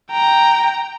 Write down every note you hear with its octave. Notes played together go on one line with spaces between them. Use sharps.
G5 A#5